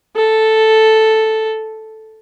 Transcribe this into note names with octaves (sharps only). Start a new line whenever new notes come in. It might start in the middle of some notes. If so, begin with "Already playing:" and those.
A4